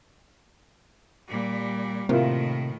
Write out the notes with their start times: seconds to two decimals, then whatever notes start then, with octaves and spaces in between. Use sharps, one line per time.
1.28 A#2 G3
2.09 A2 C3 D#3 A#3 E4 F4